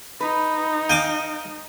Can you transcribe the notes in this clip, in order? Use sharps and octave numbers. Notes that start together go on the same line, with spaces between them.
D#4 B4
F5 G5 G#5 D6